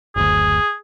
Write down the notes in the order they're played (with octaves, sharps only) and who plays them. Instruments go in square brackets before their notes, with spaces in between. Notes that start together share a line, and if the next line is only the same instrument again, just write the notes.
[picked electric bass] F#1 D2 [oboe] G#4